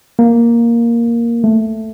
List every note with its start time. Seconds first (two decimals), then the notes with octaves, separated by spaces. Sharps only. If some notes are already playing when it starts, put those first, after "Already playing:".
0.19 A#3
1.44 A3